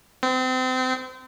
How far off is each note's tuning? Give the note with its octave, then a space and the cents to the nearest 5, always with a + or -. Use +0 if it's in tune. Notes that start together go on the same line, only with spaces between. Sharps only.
C4 -30